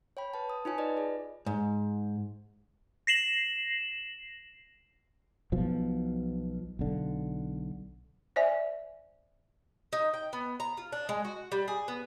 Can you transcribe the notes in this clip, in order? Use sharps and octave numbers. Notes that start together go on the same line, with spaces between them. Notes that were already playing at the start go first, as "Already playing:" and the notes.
C#5 G5 B5
B4 A5
D#6
D#4 F4 C#5 G#5 A5
B4 D5 D#5
G#4 D5
G#2
A#6 C7 E7 F#7
B1 B2 F3
B1 D3
C5 D5 E5 G#5
D#4
G5
B3
A#5
F4
D4
G#3
F#4
G3
G#4
B3